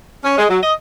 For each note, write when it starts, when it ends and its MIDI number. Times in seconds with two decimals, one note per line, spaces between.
0.24 0.37 61
0.38 0.46 56
0.49 0.58 54
0.63 0.73 75